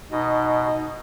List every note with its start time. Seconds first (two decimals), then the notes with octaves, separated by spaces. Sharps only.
0.12 B2 D#4 D#5